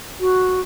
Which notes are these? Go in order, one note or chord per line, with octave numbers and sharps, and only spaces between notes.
F#4